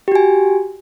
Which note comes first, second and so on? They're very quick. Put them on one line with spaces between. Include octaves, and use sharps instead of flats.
G4 F#4 G#5